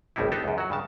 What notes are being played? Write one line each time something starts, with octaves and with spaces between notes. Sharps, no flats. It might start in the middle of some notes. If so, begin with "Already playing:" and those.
G#1 C#2 A2 G3 D#4 E4
B3 D4 D#4 G4 A4
C#2 F#2
F#3 F#4
G2 C#3 A5